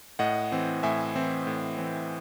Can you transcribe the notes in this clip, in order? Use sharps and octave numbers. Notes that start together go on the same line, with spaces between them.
A2 D#5 F#5
E3 C4
A2 E5 G#5
E3 C4
A2
E3 C4